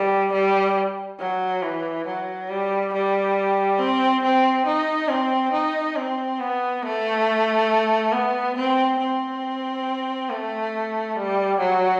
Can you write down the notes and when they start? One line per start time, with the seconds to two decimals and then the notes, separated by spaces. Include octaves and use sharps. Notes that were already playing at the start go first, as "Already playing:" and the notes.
Already playing: G3
0.33 G3
1.19 F#3
1.62 E3
2.06 F#3
2.49 G3
2.93 G3
3.79 C4
4.23 C4
4.66 D#4
5.08 C4
5.52 D#4
5.96 C4
6.39 B3
6.83 A3
8.12 B3
8.56 C4
8.99 C4
10.29 A3
11.15 G3
11.59 F#3